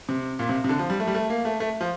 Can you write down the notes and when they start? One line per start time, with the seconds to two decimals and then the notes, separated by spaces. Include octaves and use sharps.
0.09 C3
0.39 A#2
0.49 C3
0.64 C3
0.69 D3
0.79 F3
0.90 G3
1.00 A3
1.07 G3
1.15 A3
1.30 A#3
1.45 A3
1.60 A3
1.81 F3